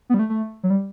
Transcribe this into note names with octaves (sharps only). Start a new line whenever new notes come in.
B3
G3
A3
A3
F#3
G3